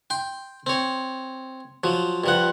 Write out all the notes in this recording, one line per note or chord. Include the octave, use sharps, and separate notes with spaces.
G5 C6
C4 C#5
F3 F#3
G2 F3 F#5